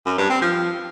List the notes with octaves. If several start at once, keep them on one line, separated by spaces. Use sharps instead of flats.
F#2
G2
C4
F3